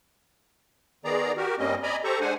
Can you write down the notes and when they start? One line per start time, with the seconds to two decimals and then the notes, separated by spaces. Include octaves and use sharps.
1.05 D#3 B3 G#4 D5 A#5
1.37 F#4 G4 A#4
1.59 G2 G3 A#3 C4 C#4 D#5
1.83 D5 D#5 G#5 A#5 B5
2.04 G4 A4 C5 A#5 C#6
2.21 G#3 D4 C5 F#5 G#5